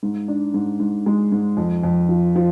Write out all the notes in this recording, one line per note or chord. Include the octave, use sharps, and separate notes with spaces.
G#2
D4
G#2
G#2
G#3
G#2
F2
F2
F3
F3